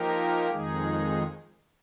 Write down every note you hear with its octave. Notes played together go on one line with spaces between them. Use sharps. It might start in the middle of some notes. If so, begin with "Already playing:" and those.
Already playing: F3 A#3 D#4 G4 A#4
F2 D#3 G#3 D#4 G#4